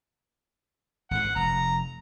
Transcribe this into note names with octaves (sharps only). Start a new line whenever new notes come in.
G#1 G#2 F#5
F1 A#5